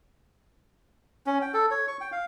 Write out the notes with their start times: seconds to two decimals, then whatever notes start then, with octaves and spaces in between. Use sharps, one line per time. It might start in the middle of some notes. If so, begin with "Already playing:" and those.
1.26 C#4
1.42 G5
1.54 A4
1.71 C#5
1.87 C#6
2.01 G5
2.12 F5